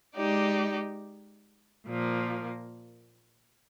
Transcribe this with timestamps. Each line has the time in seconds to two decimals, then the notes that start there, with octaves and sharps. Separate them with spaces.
0.14 G#3 D#4 G4 D5
1.86 A#2 F3 A#3